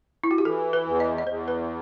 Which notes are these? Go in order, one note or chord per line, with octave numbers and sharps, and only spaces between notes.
E4
F#4
G4
E3 A4
B4
E2
D#5
D#5
E2 C5
B4